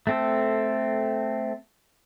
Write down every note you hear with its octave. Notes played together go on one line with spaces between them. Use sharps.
A3 C4 A4